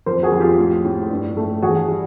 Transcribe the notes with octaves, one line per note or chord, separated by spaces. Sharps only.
F2 A#4 C5
F#4 G#4
F2
F4 G4
A2
A2
G2
A3
E2 F#4 G#4
G3